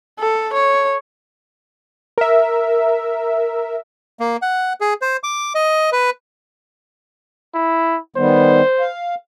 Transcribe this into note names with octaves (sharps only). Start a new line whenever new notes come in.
A4
C#5
A#4 E5
A#3
F#5
G#4
C5
D6
D#5
B4
E4
D#3 G3 B3 C5
F5